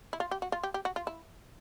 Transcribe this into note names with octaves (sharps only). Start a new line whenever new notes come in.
E4
F4
G4
F#4
F4
G4
G4
F#4
F4
E4